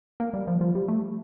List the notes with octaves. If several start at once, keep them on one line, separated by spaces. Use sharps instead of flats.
A#3
G3
F3
F3
G3
A3